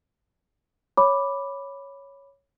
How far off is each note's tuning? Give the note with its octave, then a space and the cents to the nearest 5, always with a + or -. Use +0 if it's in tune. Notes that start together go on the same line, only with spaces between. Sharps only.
C#5 +0 B5 +0 D6 +0